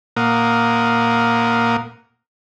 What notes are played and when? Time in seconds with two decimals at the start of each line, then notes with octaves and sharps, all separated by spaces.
0.17 A#2 A#3 A#4 F5 F#5 D#6